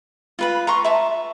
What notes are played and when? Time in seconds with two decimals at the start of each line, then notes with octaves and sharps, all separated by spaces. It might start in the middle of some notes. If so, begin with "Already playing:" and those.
0.39 F4 B4 B5
0.67 A#5 C6 C#6
0.85 E5 A5